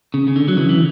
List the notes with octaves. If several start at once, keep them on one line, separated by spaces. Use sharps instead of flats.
C#3
C#3
D3
F#3
C#3 E3
E3